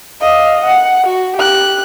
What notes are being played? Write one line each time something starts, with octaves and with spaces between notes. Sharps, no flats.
D#5 F5
F#5
F#4
G4 F#6